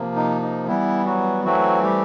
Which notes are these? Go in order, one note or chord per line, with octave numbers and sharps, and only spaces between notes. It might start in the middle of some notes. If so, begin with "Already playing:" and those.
Already playing: C3 F3 A#3
D#4
D#4
E3 G3 B3 E4
F#3 F#4
E3 F#3 A3 C4 F#4
G3 G4